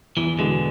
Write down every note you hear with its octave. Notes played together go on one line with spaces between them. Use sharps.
E2 E3
B2 D3 G#3 B3 F#4